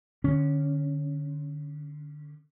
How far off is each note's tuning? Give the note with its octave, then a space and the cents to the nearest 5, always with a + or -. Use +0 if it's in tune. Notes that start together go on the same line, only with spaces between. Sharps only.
D3 +20 C#4 +0